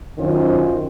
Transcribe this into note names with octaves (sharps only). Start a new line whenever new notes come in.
F#2 D#3 C#4 F4 C5